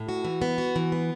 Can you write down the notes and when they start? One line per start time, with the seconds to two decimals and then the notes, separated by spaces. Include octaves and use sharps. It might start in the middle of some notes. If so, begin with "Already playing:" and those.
Already playing: A2
0.09 F#4
0.25 E3
0.42 B3
0.58 F#4
0.76 E3
0.92 B3